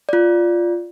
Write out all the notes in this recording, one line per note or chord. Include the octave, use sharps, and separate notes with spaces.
F4 D5